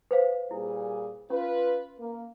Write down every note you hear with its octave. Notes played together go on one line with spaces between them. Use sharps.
B4 C5 F5
A#2 G3 E4 G#4
C#4 F4 B4
A#3